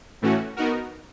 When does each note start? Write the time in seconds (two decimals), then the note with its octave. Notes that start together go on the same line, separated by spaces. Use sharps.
0.22 A2 E3 A3 C#4 F#4
0.57 B3 D#4 F#4 A#4